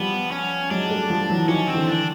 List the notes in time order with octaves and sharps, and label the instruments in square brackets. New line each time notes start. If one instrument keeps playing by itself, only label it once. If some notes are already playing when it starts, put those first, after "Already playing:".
Already playing: [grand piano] F3 G3 [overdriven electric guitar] B3
[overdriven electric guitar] C#4
[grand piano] F#3 G#3 [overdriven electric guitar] D4
[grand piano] G3 A3
F3 G3
E3 F#3
[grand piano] D#3 F3 [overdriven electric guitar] C#4
[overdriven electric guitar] C4
[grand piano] D3 E3
[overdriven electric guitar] D4